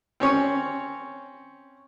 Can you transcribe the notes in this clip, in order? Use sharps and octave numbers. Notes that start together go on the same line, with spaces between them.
C4 C#4 C#5